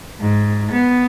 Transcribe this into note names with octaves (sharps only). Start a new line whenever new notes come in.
G#2
B3